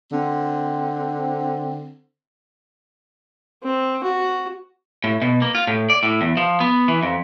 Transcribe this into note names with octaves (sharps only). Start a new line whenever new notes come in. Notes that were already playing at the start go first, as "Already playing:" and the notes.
D3 C4
C4
F#4
A2
B2
A#3
F4
A2
D5
A2
E2
F3
B3
E3
F2